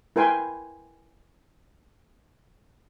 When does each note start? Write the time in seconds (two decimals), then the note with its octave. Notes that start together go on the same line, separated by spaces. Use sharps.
0.16 E4 A#4 B4 G5 G#5 C6